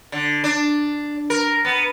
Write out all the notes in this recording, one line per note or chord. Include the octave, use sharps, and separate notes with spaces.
D3
D4
A#4
B3